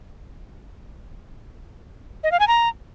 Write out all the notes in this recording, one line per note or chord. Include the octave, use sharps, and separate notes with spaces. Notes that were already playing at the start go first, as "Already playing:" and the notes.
D#5
F5
G#5
A#5